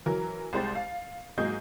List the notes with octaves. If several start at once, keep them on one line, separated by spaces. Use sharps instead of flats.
E3 F#3 A#4
C2 G#3 G4 C5 A6
F5
G#2 F#3 A#3 G#4 D#5 G6